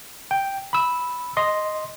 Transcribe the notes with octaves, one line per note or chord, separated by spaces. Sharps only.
G5
B5 E6
D#5 C6